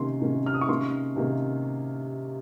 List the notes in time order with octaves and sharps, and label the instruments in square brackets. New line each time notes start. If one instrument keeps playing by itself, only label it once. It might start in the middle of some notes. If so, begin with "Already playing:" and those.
Already playing: [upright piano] C3 D#3 A#3 C#4 C6
C3 D#3 A#3 C#4
F6
D#6
C#6
C3 D#3 A#3 C#4 C6
C3 D#3 A#3 C#4